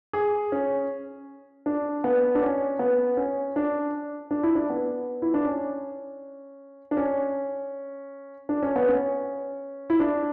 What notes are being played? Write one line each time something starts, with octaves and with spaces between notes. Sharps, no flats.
G#4
C#4
D4
B3
D4
C#4
B3
C#4
D4
D4
E4
D4
B3
E4
D4
C#4
D4
C#4
D4
C#4
B3
C#4
E4
D4